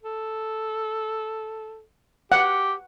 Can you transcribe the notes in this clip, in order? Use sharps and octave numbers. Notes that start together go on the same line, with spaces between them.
A4
G4 F#5